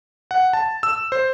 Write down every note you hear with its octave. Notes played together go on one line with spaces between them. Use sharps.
F#5
A5
E6
C5